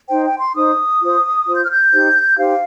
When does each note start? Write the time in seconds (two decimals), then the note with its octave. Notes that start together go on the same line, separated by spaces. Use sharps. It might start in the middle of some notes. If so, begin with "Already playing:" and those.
0.09 D#4 C5 G5
0.24 G5
0.39 C6
0.54 D#4 C5 D#6
1.00 F4 C5
1.45 F4 C5
1.54 G6
1.62 F6
1.72 G6
1.92 D#4 G4 C5
2.37 D#4 G4 C5 F5